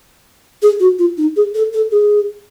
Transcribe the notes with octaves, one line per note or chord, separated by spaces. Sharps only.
G#4
F#4
F4
D#4
G#4
A4
A4
G#4